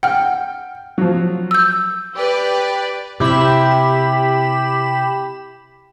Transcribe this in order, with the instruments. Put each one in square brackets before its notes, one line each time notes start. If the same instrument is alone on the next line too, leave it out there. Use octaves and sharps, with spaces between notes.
[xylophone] F#5 F6 [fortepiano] G5
[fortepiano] F3 F#3
[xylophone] E6 G6
[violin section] G4 B4 D5
[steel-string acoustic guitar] C3 E4 [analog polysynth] G4 B5 E7